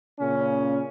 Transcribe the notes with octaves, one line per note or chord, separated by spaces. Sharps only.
A#2 C#3 C#4